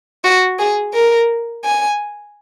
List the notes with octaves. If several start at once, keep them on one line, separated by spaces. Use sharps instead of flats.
F#4
G#4
A#4
G#5